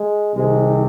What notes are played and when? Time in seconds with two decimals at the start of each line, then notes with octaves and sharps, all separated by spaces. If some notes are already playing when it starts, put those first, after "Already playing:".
Already playing: G#3
0.34 C2 C3 D#3 G#3